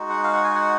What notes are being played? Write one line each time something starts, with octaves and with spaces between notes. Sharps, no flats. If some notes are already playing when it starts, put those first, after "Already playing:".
Already playing: G#3 D#4 F#4
F#5
F5
F#5
G#5
F#5